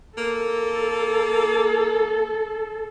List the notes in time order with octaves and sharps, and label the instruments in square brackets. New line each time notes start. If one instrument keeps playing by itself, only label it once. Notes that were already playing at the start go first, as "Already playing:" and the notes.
[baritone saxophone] A#3 [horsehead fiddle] A4